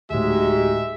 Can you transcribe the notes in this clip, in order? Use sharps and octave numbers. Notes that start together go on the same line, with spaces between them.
D2 A2 G#3 D#4 F#4 G4 E5